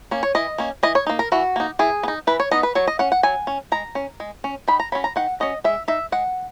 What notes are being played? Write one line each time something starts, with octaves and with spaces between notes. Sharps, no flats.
A#3 C#4
C#5
E3 D#5
A#3 C#4
E3 D#5
C#5
A#3 D#4
A#4
E3 F#4
A#3 D#4
E3 G#4
B3
D#4
E3 B4
C#5
B3 D#4 D#5
B4
F#3 C#5
D#5
C#4 F#5
F#5
F#3 G#5
C#4
G#3 A#5
C#4
G#3
C#4
D#3 B5
A#5
F#3 C#4 B5
A#5
D#3 F#5
F#3 C#4 D#5
G#3 E5
D#4 E5
G#3 F#5